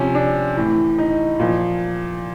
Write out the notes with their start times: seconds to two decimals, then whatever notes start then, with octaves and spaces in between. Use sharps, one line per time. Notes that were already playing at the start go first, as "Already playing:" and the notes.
Already playing: C3 F3 C#4
0.15 D4
0.57 A2 E3
0.98 D#4
1.40 A#2 F3